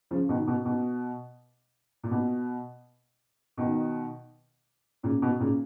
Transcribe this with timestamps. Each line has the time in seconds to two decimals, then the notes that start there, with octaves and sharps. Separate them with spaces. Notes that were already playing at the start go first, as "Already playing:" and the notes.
0.11 C#3 F3
0.29 B2 D#3
0.47 B2
0.65 B2
2.03 A#2
2.11 B2
3.58 B2 D#3
5.03 A#2 C#3
5.22 B2
5.40 A#2 C#3